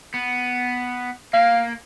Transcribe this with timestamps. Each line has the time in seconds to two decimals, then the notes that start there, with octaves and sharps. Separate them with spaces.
0.14 B3
1.34 A#3 F5